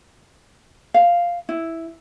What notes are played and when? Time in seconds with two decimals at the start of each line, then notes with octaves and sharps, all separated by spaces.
0.94 F5
1.49 E4